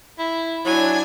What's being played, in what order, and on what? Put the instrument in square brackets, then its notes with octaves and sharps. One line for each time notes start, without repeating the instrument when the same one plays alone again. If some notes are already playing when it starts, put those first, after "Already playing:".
[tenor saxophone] E4
[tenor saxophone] F#3 [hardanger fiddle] D4 G#5 [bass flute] E4